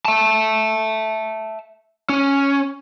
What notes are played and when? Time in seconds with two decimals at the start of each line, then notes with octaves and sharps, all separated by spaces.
0.05 E5 A5
2.09 C#4